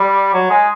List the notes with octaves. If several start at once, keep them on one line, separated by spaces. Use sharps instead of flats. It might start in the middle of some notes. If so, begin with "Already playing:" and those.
Already playing: G3
F#3
G#3